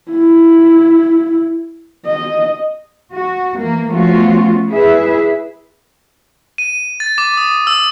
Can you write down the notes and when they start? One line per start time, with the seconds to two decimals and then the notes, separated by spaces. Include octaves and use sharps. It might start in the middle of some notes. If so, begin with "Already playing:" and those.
0.11 E4
2.05 D#5
3.14 F#4
3.59 E3 A#3
3.91 F3 A3 B3 C#4 F4 F#4
4.69 E4 G#4 B4 E5
6.58 D#7
7.00 A6
7.18 D6
7.37 D#6
7.67 E6